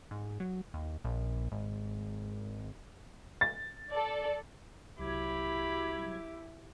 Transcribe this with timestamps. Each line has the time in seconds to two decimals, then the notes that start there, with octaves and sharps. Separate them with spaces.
0.11 G#2
0.40 F#3
0.74 D#2
1.05 A#1
1.52 G#1
3.41 A6
3.90 A4 D5
4.98 C2 F#3 E4 G4 B5 D6 G#6